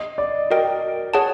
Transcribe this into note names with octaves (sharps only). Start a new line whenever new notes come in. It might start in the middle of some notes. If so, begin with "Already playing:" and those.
Already playing: D#5
D5
F#4 A#4 D#5 G5
G#4 C#5 F#5 A5